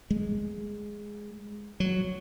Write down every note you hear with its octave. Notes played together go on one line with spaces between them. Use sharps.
G#3
F#3